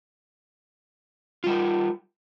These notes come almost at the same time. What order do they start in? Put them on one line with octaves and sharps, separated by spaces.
F4 G3 A#4